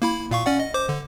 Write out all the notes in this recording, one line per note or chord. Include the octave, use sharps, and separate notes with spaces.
A#3 E4 B5
A#2 F5 C#6
C#4 D5 F#5
D#5
C5 D6
D3